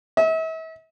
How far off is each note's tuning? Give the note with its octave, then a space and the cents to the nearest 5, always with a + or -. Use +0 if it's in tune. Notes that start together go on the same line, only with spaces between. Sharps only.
E5 -40